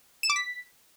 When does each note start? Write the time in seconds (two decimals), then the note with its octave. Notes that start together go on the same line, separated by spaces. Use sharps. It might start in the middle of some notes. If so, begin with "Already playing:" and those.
0.23 E7
0.30 D6
0.36 B6